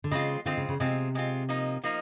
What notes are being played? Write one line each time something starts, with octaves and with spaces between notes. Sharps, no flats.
D3
C#3 G#3 C4 F4
D3 G#3 C4 F4
C#3
C#3
C3 G#3 C4 F4
G#3 C4 F4
F3 A#3 D#4
F3 A#3 D#4